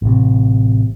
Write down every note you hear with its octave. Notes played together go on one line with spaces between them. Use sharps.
A1 C3